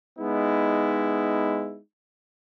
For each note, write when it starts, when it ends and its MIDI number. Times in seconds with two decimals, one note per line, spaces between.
0.18 1.79 56
0.18 1.79 59
0.18 1.79 63
0.18 1.79 64